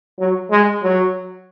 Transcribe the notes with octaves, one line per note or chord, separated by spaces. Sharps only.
F#3
G#3
F#3